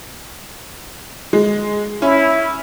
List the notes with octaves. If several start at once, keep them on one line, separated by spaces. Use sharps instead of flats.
G#3
C#4 E4